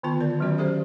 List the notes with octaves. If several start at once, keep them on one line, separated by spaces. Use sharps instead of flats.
D3 D#3 B3 F4 A5
A#4 D5
D#3 F#3 C#4 F#4 D5
G4 A4 C5 E5